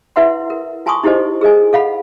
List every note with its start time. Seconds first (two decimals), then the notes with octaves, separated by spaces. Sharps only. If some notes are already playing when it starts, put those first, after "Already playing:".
0.16 E4 B4 E5 F#5 C6
0.50 A#4
0.86 F4 G#5 A5 C6 C#6 D#6
1.03 D#4 E4 G4 A4 C5 D#5
1.41 G#4 A#4 D#5 G#5
1.73 A4 F5 F#5 B5